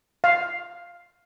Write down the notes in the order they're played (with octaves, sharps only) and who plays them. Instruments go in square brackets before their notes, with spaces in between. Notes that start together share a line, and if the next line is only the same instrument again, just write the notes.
[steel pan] F5